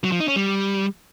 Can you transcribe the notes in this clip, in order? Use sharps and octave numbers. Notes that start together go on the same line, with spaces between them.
F#3
F3
D#4
C#4
G3